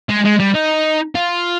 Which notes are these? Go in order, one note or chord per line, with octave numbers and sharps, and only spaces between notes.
G#3
G#3
G3
D#4
F4